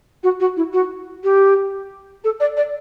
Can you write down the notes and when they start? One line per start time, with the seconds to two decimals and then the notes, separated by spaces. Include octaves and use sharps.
0.23 F#4
0.40 F#4
0.57 E4
0.73 F#4
1.24 G4
2.24 A4
2.40 D5
2.57 D5